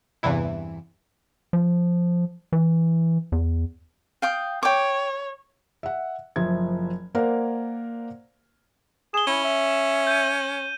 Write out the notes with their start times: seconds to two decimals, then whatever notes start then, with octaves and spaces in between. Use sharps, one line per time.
0.23 E2 G2 C3 E3 E4
1.53 F3
2.52 E3
3.32 E2
4.22 F5 G5 D#6
4.63 C#5 G5 D6
5.83 E5 F#5
6.36 F#1 F3 E5 G#6
7.15 A#3 A#4 C5 D5 F5 F#5
9.14 G#4 E7 G7
9.27 C#4 E4
9.44 E5
10.07 G6 D#7